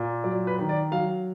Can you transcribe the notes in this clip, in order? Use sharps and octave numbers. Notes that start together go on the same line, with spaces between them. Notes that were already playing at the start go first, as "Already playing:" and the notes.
Already playing: A#2
F#3 D5
B4
D#3
D5
F#3 F5